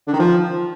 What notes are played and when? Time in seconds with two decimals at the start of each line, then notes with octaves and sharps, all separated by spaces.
0.07 D3
0.13 D#3
0.19 F3